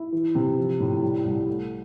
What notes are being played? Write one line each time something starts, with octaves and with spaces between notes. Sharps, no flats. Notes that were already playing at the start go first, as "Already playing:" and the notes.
Already playing: E4
E3
C3
F3
A2
G3
C2
A3